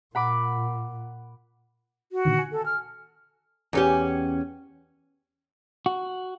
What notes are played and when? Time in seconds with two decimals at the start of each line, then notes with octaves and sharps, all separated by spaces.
0.15 A#2 F#5 B5 D6
2.12 F#4
2.25 A#2 D3 D#3
2.39 G#5
2.52 A4
2.66 F6
3.73 E2 C#4 G4
5.86 F#4